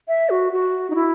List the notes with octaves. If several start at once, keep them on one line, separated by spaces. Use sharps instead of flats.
E5
F#4
F#4
D#4
E4